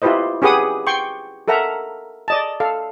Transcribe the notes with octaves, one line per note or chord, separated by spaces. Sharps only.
E4 F4 G4 B4 C5 D#5
C#4 G4 G#4 B4 F#5 D#6
G5 C6 C#6
A4 A#4 E5 F#5 A#5
D5 D#5 A5
A4 F5